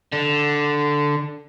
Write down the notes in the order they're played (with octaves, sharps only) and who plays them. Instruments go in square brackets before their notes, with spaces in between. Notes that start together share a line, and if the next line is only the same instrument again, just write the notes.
[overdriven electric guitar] D3